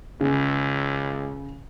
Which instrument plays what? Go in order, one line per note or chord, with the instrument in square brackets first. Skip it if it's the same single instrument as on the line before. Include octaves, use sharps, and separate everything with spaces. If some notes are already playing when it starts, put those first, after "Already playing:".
[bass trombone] C#2 [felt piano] C#3